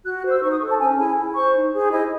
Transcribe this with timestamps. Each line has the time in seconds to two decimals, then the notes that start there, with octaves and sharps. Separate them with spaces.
0.05 F#4 F#6
0.18 F#6
0.24 C5
0.30 E6
0.42 D#4 C#6
0.51 D#6
0.61 A4 C5 C#6
0.70 A5
0.80 C#4 G#5
0.98 E4 G#4 G#5
1.16 E4
1.35 C5 C#6
1.54 D#4
1.73 G#4 C5
1.91 E4 D#5